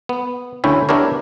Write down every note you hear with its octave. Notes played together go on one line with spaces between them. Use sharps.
B3
D2 D3 C#4 E4 E5 G5
B3 D4 E4 G4 A#4 C#5